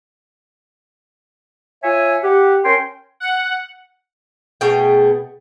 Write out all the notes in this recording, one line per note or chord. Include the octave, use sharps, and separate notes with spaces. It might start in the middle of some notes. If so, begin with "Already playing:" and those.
F4 C#5 E5 G#5
G4 F#5
C#4 A#4 G5 G#5 C6
F#5
B2 A3 G#4 G5